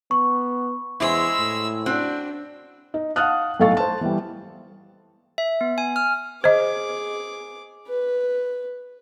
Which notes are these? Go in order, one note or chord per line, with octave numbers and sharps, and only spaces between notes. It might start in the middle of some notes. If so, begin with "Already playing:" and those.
B3 C#6
E2 G#3 E4 C5 E6
A2
C4 D4 F#4
D#4
F5 F#5 A5 D#6 F6 F#6
B1 A2 A4 F5 C#6 A6
C5 A5
E3 G3
E5
B3
G#5
F6
G#4 C5 D#5 D6
B4